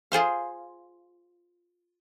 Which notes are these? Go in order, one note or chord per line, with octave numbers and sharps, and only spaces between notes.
F4 G#4 C5 F5